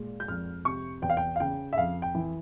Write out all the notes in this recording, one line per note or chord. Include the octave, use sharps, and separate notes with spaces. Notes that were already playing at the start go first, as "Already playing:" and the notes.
Already playing: A#2 G#3
G6
F2 F6
C3 C#6
E2 G5
F5
G5
F5
C#3 G5
E5
F2 F5
G5
E3